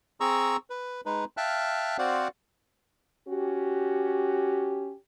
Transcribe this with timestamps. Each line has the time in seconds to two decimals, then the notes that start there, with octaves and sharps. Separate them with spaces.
0.20 C4 G#4 A#5 C#6 E6
0.70 B4
1.06 G#3 D#4 B4
1.37 E5 F5 G5 A5 F6 F#6
1.98 C4 F#4 C5 D5 F5 F#5
3.27 C#4 F#4 G4